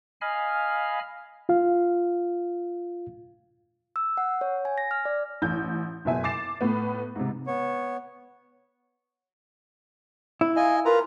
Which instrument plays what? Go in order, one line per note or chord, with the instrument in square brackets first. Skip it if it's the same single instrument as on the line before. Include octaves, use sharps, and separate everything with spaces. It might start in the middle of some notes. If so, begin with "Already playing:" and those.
[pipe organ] D#5 F5 G#5 B5 F6
[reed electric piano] F4 F5
[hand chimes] E6
F#5
C#5
G#5
A#6
F6
D5
[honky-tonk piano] A1 G6
F#1 B2 E5 G#5
D6 A6 C7 E7
A2 B3
G#2 C3
[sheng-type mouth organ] B3 C#5
[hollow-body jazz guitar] E4
[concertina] D#5 G#5 [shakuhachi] F5
[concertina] F4 B4 A#5 [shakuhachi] A#4